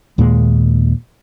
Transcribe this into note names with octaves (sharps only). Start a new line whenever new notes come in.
D#2 A#2 G#3